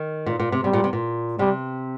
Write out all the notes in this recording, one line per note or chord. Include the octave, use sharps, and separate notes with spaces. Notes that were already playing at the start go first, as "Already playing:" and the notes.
Already playing: D#3
A#2
A#2
C3
C3 G3
A#2
C3
A#2
C3 G3